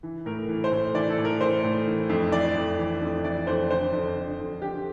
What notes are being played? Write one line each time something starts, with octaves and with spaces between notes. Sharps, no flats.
E3
A2 A#4
E3
C5
A2
E3 D5
A4
A2
A#4
E3 C5
A2
E3
F2
E3 D5
F2
E3
F2
E3 D5
F2 C5
D3 C5
F2
D3
F2
D3 G4